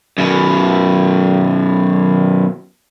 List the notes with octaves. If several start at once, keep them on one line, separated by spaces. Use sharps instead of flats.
F#2 B2